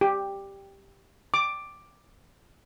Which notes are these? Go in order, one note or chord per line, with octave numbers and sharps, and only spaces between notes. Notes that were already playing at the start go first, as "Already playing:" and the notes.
G4
D6